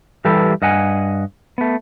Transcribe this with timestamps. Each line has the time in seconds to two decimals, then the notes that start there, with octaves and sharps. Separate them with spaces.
0.25 E3 G3 G4 A4 B4
0.62 G2 D#5 F#5 G#5
1.58 A3 B3